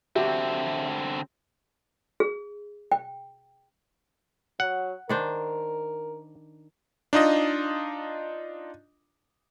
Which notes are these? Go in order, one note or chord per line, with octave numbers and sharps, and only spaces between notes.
D3 C4 F#4 G4 E5
G#4
G5
F#3 F#5
D#3 D4 A#4 C5
D4 D#4 F4 D#5